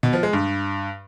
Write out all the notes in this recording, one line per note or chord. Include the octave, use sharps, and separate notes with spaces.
B2
F3
G#3
G2